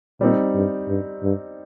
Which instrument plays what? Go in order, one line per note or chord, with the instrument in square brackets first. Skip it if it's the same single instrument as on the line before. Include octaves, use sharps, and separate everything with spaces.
[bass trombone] A#2 [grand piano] G3 C4 D#4
[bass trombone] G2
G2
G2